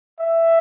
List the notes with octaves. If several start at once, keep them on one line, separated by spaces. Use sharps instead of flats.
E5